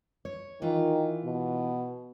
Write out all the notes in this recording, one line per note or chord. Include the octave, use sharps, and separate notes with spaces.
C#5
D#3 E3 F4
B2